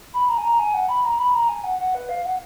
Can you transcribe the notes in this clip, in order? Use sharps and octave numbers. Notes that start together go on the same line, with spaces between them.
B5
A#5
G#5
A#5
G#5
F#5
B5
A#5
B5
A#5
G#5
F#5
F#5
B4
F5
F#5